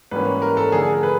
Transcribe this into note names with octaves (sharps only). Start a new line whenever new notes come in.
G#2 E3 G3 A#3 C#4 B4
A#4
A4
D3 F3 A3 D4 G#4
G#4
A#4
B4